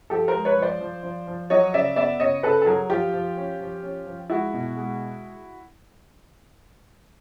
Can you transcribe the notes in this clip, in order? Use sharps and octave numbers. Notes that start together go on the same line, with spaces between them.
F3 G4 A4
A#4 C5
G#3
B4 C#5
F3
C5 D5
F3
F3
F3
F#3 C#5 D#5
C#3 D5 E5
B3 D5 E5
C#3 C#5 D#5
C#3 A4 B4
A4
F#3 G#4 A#4
F3 F4 G4
F3
C#4
F3
C#4
F3
G#3 E4 F#4
B2
G#3